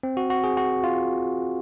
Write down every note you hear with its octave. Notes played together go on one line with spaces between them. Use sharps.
C4
F#4
F#4
G#4
F#4
F4